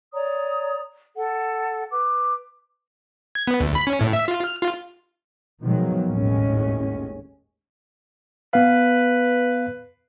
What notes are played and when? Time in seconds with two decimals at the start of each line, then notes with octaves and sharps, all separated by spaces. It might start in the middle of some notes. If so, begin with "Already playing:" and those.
0.13 C#5 D5 A#5 D#6
1.16 A4 F#5
1.91 B4 D6
3.35 G#6
3.47 B3
3.60 D2
3.75 B5
3.87 C#4
4.01 A2
4.13 E5
4.28 F4
4.44 F6
4.61 F4
5.62 B2 D#3 F3 F#3 G#3
6.07 G#1 D#2 A2 G#3 C#4
8.53 B3 B4 F5